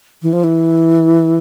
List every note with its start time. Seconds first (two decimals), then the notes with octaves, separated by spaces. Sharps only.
0.22 E3
0.33 F3
0.44 E3